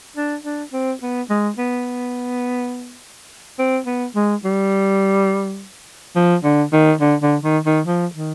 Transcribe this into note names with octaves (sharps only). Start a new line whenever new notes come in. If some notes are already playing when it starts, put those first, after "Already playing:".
D4
D4
C4
B3
G#3
B3
C4
B3
G#3
G3
F3
D3
D#3
D3
D3
D#3
D#3
F3
D#3